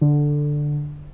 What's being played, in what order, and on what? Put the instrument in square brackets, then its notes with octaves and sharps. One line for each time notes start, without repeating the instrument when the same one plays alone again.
[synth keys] D3